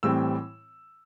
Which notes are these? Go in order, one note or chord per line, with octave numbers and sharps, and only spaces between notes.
A2 E3 G3 C4 E6